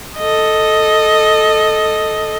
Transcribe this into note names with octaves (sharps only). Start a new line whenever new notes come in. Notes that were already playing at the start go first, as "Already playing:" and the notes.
A4 D#5